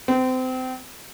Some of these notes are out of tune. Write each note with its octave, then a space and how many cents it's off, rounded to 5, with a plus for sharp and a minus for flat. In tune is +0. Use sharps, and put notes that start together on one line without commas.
C4 -30